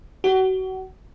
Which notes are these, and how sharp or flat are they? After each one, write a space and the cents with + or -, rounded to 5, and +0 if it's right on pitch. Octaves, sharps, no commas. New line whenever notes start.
F#4 +30